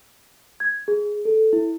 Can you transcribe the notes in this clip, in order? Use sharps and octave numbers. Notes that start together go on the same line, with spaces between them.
G#6
G#4
A4
E4